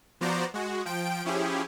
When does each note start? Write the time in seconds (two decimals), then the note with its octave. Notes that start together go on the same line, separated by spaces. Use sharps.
0.21 F3 B3 F#4 C5 D5 A#5
0.54 G#3 F#4
0.85 F3 G5 D7
1.25 F3 C#4 E4 G4 G#4